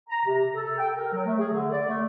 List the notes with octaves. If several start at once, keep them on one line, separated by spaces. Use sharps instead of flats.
A#5
C3
A4
G5
A#4
F#3
A3
G#4
D3
D5
A3